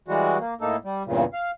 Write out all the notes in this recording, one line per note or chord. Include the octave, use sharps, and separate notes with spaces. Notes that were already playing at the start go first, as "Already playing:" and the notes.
E3 G3 G#3 F#4
A#3
A2 A#3 D#4 A4
G3
E2 G2 A#2 C#3
F5